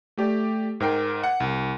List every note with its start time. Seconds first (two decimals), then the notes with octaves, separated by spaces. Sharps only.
0.17 A3 G4 D5
0.80 G#2 A#4 G5 C7
1.23 F#5
1.40 C2